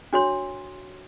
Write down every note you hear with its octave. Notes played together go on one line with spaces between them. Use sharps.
D4 F#4 C#5 C6